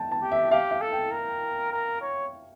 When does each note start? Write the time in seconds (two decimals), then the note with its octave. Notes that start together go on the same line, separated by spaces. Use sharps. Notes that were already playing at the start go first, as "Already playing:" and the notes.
Already playing: G5 A5
0.12 A5
0.22 G4
0.32 E5
0.51 G4 F5
0.71 F5
0.81 A4
0.92 G5
1.11 A#4
1.72 A#4
2.01 C#5